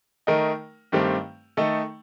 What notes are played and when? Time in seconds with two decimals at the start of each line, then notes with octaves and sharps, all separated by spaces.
0.27 D#3 A3 D#4 A#4
0.92 G2 D#3 A3 C4 G4
1.57 D#3 A3 D#4 A4